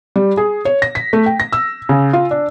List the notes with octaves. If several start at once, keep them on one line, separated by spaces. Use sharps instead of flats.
G3
G#4
C#5
A#6
B6
A3
G5
A#6
E6
C#3
F4
D4